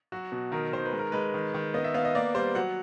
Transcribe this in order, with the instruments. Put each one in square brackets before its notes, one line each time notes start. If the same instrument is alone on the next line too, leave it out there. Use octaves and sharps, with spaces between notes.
[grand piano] F#3 F#4
B2
D#3 A#4
D#3 C5
B4
G#3
A#4
G#3 B4
D#3
D#3
B3 D#5
E5
B3 F5
D#5
A#3 D5
G3 C5
F#3 F#5